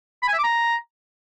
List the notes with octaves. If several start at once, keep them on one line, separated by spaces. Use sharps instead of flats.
B5
G#5
E5
D6
A#5